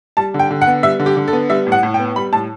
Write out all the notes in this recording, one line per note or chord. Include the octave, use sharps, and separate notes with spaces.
G3 A5
D3
G5
D3
F#5
B3
G3 E5
D3
G4
D3
A4
B3
G3 E5
A2
F#5
A2
G5
B3
G3 B5
A2 A5